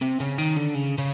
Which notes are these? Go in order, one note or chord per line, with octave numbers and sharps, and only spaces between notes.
C3
C#3
D#3
D3
C#3
C#3